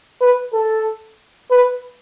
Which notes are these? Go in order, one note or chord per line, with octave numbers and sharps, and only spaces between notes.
B4
A4
B4